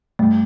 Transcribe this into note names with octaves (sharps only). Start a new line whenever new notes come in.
G2 A3